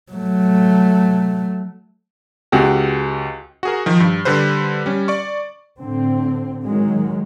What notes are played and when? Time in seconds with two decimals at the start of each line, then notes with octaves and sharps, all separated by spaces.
0.12 F#3 A3
2.52 C#2 F#4 G4
3.63 F#4 G#4 A#4
3.86 D#3 F3
4.00 G2
4.25 D3 G3 B4 C5
4.86 G3 C#4
5.08 D5 C#6
5.80 A2 D3 C4
6.66 D#3 F#3 G#3